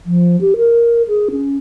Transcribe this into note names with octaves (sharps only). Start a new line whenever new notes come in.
F3
G4
A#4
G#4
C#4